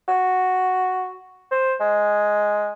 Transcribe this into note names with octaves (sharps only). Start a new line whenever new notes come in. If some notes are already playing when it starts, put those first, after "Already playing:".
F#4
C5
G#3